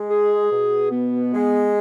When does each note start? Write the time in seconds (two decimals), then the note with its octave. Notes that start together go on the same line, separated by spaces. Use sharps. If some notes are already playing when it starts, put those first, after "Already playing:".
Already playing: G#3
0.09 G#4
0.50 B2
0.91 B3
1.32 G#3